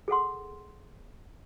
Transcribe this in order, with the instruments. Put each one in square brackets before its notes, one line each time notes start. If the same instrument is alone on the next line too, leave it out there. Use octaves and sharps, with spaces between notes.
[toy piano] G#4 A4 F#5 C6